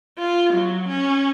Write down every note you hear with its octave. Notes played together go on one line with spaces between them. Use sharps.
F4
F#3
C#4